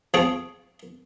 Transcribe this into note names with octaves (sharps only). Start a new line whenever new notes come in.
F3 C4 G#4 C#6